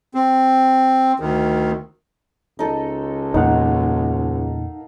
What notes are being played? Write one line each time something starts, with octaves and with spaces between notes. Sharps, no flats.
C4
D2 D#3
C#2 D#4 A4
E2 A#2 A#3 D#4 A#4 F5 F#5